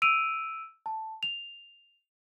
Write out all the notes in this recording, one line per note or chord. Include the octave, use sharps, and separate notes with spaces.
E6 D7 D#7 F7
A5
F7